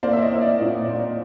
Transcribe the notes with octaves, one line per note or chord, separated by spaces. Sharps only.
A#3 C5 D5
E5
C#5 D#5
A#3
D5 E5
A#2 C#5 D#5
D#5
A#3 C5 D5